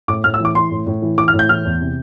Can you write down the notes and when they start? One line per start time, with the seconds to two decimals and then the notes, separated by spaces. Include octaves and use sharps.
0.08 A2 D6
0.24 A2 F6
0.34 E6
0.40 E3
0.45 D6
0.55 E3 C6
0.71 A2
0.86 A2
1.02 E3
1.18 E3 D6
1.28 F6
1.34 A2
1.39 G6
1.49 E3 F6
1.65 E2
1.80 C3